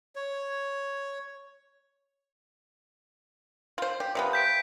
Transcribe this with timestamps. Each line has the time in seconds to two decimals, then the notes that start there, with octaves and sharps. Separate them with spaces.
0.15 C#5
3.78 F4 C5
4.00 G4
4.15 C3 F3 B3
4.33 G6 B6 D7